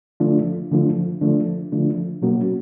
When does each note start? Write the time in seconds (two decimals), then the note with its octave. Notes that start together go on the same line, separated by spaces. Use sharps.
0.20 D3 F3 A3 D4 F4
0.71 D3 F3 A3 D4 F4
1.21 D3 F3 A3 D4 F4
1.72 D3 F3 A3 D4 F4
2.22 B2 F#3 A#3 C#4 F#4